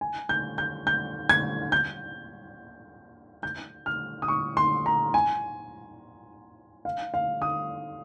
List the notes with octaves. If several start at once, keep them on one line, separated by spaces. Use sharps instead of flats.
G#5
G6
G6
G6
G#6
G6
G6
F6
D#6
C#6
C6
A#5
G#5
F5
F5
D#6